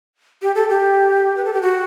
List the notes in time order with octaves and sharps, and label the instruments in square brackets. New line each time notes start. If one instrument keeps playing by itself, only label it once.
[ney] G4
A4
G4
B4
A4
G4
F#4